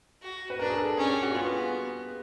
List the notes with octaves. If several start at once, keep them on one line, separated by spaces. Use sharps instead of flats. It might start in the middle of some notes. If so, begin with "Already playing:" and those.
F#4
B4
D4 A#4
G#4
A4
C#4 G#4
G4
F#4
B3 F4